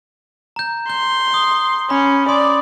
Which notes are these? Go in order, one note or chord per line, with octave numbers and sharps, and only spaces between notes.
A#5 G6
C6 G6
D#6
C#4 B5
D5 C6 D#6